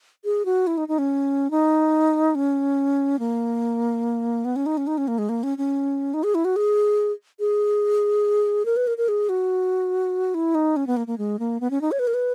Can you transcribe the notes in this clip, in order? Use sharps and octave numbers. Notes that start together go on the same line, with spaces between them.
G#4
F#4
E4
D#4
D#4
C#4
D#4
C#4
A#3
B3
C#4
D#4
C#4
D#4
C#4
A#3
G#3
A#3
C#4
C#4
D#4
G#4
E4
F#4
G#4
G#4
A#4
B4
A#4
A#4
G#4
F#4
E4
D#4
C#4
B3
A#3
A#3
G#3
A#3
B3
C#4
D#4
C#5
B4
A#4
B4